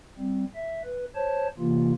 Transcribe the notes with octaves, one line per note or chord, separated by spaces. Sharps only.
G3 C4
E5
B4
C5 C#5 A5
C3 E3 A#3 F4